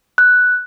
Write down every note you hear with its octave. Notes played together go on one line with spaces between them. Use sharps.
F#6